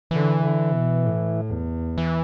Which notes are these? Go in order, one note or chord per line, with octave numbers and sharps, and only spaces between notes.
D3 E3
D3
B2
A2
E2
E3